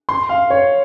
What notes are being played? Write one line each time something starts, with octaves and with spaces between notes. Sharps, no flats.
C6
F5
C#5